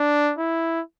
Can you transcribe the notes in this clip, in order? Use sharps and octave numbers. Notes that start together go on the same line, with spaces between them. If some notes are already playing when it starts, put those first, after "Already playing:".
Already playing: D4
E4